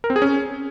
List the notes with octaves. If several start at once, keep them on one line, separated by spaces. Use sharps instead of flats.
A#4
C4
G#4
C#4